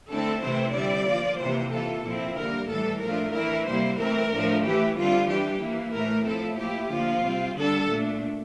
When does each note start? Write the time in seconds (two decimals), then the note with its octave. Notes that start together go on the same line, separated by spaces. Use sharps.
0.09 D3 A3 C4 E4 A4
0.41 C3 E3 A3 C4 E4 C5
0.74 D3 G3 C4 E4 D5
1.06 F3 A#3 F4
1.38 C3 E3 A#3 C5
1.71 E3 A#3 F4 A4
2.03 A#2 F3 C4 E4
2.36 D3 G3 A#3 A#4
2.69 A2 E3 G3 A4
3.01 A2 F3 A3 D4 F4 A#4
3.33 E3 A3 E4 A#4
3.66 C3 G3 A#3 E4 C5
3.98 E3 A3 C4 E4 A#4
4.31 A2 F3 A3 D4
4.63 E3 A3 E4 G4
4.96 D3 G3 C4 F4
5.28 E3 G3 D4 G4
5.60 E3 A#3 E4
5.93 A2 E3 A3 A#4
6.25 A2 F3 C4 E4 A4
6.58 F3 A#3 E4 G4
6.90 D3 F3 A#3 F4
7.23 C3 G3 C4
7.55 D3 G3 D4 A4
7.88 A#2 A3 D4